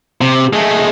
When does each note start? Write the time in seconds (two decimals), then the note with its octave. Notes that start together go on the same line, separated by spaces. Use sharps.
0.21 C3
0.53 G#3 A3